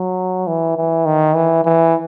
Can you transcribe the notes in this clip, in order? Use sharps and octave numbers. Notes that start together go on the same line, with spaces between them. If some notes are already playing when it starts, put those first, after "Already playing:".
Already playing: F#3
E3
E3
D#3
E3
E3